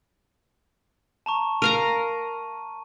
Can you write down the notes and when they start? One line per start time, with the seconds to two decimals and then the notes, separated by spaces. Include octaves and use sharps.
1.26 A5 A#5 C#6
1.62 A#4 F5 A#5 D#7